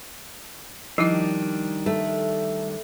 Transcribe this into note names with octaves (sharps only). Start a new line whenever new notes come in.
D#3 F3 G3 D4 E4 D#5
A3